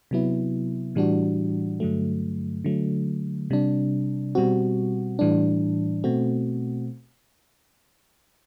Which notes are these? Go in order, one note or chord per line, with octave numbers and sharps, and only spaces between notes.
C3 F#3 B3 E4
A2 E3 G3 D4 F#4
G2 D3 F#3 A3
D3 F#3 A3
C3 G3 D4
B2 G3 C4 F#4
A2 E3 G3 D4
B2 A3 C4 F#4